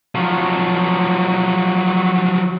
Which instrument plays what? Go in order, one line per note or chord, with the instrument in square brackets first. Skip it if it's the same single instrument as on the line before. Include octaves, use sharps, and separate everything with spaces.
[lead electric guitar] F3 F#3